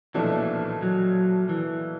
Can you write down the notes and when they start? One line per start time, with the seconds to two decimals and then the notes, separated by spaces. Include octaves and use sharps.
0.14 B1 A#2 E3 F3 A3 D4
0.82 F#3
1.49 E3